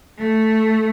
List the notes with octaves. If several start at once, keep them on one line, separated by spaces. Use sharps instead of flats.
A3